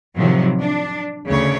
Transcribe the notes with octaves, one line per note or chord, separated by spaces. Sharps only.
A2 C3 D#3 F3 F#3
D4
D2 C#3 C#5